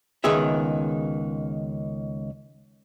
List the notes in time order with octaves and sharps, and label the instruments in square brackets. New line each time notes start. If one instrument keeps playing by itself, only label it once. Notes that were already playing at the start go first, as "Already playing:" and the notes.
[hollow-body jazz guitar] C#2 D#3 B3 G#4 E5